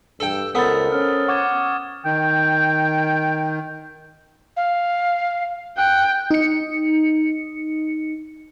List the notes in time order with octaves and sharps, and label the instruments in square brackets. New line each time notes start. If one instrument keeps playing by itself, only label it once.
[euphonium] G2 [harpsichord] A4 G5
[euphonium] C#2 [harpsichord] B3 [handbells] A4 A#4 C5 [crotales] D#6 A6
[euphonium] C#4 [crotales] F6
[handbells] F#5 [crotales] C#6 D6 G#6
[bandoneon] D#3 [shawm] G5
[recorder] F5
[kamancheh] G5 [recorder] F#6
[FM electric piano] D#4 C#7